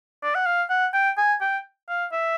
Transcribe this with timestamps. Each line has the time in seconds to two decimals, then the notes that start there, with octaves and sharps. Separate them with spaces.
0.23 D5
0.35 F#5
0.46 F5
0.70 F#5
0.94 G5
1.17 G#5
1.41 G5
1.89 F5
2.12 E5